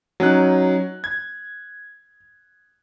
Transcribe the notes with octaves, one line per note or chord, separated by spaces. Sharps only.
F#3 C#4 D#4 F#6
G#6